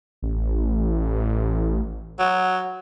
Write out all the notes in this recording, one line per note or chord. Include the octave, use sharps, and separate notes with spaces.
A1
F#3